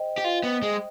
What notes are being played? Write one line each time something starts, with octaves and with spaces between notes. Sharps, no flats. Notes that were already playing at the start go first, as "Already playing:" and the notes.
Already playing: C5 D#5 G5
G4
F4
B3
G#3